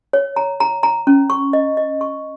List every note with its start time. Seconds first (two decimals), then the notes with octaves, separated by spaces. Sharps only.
0.13 C#5
0.36 A#5
0.60 A#5
0.83 A#5
1.07 C#4
1.30 C#6
1.53 D#5
1.77 D#5
2.01 C#6